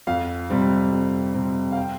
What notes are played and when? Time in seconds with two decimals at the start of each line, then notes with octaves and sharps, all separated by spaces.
0.07 F2 F5
0.50 C3 G3 C4
0.91 F2
1.34 C3 G3 C4
1.72 F5
1.76 G5